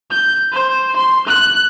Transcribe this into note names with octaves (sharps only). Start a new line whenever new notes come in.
G6
C5
C6
F#6